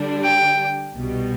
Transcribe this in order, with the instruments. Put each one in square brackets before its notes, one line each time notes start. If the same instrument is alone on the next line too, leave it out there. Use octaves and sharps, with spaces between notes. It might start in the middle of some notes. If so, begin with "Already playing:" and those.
Already playing: [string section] D3 G3 D4
[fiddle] G5
[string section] C2 B2 G3